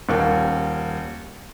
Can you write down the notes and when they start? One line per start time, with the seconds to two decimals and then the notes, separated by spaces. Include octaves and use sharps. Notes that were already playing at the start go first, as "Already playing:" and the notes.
0.09 D#1 D#2 A#4